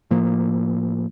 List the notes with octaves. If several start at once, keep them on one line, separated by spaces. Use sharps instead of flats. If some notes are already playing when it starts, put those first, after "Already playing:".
A2 F3 A#3